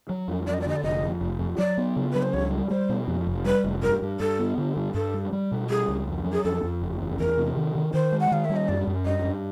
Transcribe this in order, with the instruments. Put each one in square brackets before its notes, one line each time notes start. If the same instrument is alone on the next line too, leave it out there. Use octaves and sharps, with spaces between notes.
[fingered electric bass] F#3
F2
[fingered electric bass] F#3 [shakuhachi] D5
[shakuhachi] D#5
D5
[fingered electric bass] D3 [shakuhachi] D#5
[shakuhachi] D5
[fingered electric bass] F1 [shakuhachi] D#5
[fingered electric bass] F2
F1
F2
[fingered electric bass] F#3 [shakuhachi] D5
[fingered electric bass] B3
C#3
[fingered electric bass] F#3 [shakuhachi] B4
[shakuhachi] C5
[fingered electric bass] C#2 [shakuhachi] C#5
[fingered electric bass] G3
[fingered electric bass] G3 [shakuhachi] C5
[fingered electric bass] B2
F2
F1
[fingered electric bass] G3 [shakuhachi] B4
[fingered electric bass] F1
[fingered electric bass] G2 [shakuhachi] A#4
[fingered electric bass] G2
[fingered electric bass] G2 [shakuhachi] A4
[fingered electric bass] B3
D3
G2
[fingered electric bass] G2 [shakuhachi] A4
[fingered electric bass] G3
G3
B2
[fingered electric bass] G3 [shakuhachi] G#4
[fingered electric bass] C#2
F2
F#3
[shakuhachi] G#4
[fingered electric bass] F2 [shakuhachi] A4
[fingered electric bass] F2
F#1
E2
[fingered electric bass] E2 [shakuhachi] A#4
[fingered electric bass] C3
D#3
D#3
[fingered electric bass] D#3 [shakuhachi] C5
[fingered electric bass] G#3
[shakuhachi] F#5
[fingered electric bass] D#3 [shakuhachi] F5
[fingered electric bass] G3 [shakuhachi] E5
[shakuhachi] D#5
[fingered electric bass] F#2 [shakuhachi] D5
[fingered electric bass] F#2
[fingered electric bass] G2 [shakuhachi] D#5
[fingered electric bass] G2